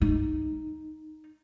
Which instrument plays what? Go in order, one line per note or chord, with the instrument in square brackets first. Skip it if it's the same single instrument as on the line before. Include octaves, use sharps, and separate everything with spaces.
[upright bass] D#4